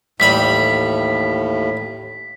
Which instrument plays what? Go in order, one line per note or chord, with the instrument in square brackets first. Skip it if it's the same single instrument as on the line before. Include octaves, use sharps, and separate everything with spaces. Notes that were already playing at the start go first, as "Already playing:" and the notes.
[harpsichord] A1 G3 B5 [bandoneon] D#2 A2 [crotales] B6